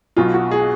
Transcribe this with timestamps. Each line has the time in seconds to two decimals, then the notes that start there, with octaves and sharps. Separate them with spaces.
0.17 B1 B2 F#3 F4
0.34 F#4
0.51 G#4